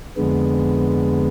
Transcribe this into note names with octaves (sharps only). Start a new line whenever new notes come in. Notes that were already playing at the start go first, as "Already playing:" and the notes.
F2 D3 G#3 B3